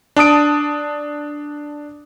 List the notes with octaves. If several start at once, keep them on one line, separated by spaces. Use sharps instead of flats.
D4 A5 D#6 D7